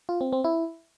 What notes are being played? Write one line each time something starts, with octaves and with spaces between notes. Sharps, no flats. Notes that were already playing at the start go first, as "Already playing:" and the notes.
F4
C4
C4
E4